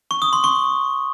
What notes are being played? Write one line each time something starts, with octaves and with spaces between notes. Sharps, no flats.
C#6
D#6
C6
C#6